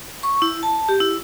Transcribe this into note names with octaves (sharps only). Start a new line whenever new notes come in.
C#6
E4
A5
G4
E4